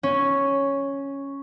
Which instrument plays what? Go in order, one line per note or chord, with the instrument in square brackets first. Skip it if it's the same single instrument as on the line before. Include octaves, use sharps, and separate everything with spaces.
[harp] C#4